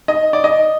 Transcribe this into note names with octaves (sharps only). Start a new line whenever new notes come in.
D#5
D5
D#5